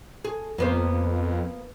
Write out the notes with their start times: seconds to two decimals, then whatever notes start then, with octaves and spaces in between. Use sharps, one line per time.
0.25 G#4
0.58 F2 A#3 B3 C5